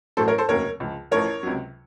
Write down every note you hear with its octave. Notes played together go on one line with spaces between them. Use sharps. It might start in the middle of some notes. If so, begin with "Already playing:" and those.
A1 A2 F#3 A4 C5
A#4 C#5
A4 C5
F1 D#2 C#3 F#3 A#4 C#5
C#2 C#3 F3
A1 A2 F3 A#4 C#5
C#2 C3 F#3